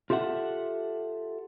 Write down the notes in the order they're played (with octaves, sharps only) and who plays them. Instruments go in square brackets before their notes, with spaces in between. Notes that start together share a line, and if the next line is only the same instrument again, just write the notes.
[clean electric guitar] F4 G4 A4 E5 F#5